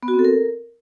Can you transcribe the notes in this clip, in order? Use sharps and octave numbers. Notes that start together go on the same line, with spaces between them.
B3
F#4
C4
A4
A#4